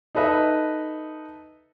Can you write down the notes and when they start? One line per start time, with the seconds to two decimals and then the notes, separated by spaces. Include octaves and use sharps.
0.15 D#4 A4 B4 D#5 E5